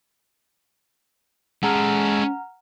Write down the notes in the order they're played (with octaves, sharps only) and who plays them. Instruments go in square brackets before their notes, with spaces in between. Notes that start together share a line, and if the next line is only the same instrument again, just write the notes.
[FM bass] G#3 [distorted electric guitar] C#4 A4 [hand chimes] F#5 A#5 F6